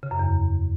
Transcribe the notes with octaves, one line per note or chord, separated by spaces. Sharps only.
C#3
F#2
E2